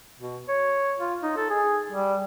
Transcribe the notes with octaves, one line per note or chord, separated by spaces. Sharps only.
B2
C#5
F4
D#4
A4
G#4
G3